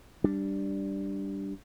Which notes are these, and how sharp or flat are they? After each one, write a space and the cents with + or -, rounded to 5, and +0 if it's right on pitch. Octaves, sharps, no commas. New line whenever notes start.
G3 +0 D4 +0